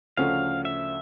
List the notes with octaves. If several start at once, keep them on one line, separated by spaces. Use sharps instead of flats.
D2 C#3 F3 A3 C#4 F5
E5